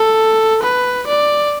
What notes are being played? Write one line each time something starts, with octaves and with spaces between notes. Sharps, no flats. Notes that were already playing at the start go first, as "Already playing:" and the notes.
Already playing: A4
B4
D5